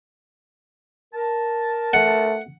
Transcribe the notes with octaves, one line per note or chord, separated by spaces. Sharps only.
A#4 A5
A3 F#5